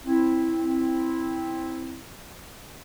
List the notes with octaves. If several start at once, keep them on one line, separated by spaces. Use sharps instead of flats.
C4 E4